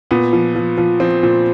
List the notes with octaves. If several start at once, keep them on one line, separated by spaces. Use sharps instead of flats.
A#2 B3
F3
F3
F3
F3 C4
A#2